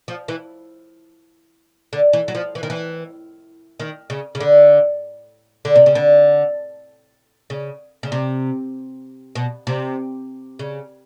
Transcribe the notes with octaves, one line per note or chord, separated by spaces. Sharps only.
F3
E3
D3
E3
F#3
F3
E3
D#3
E3
D#3
C#3
C#3
D3
D3
C3
C#3
D3
C#3
C#3
C3
B2
C3
C#3